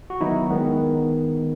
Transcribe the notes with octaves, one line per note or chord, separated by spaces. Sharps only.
F#4
D#3 F#3 B3 D#4 E4
D#3 G#3 B3